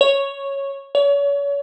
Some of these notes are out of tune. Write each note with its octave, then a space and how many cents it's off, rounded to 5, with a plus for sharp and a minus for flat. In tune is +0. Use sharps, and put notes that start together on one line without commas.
C#5 -5
C#5 +35